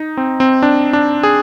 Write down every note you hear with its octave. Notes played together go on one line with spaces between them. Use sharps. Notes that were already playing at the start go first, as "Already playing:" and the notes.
Already playing: D#4
C4
C4
D4
D4
G#4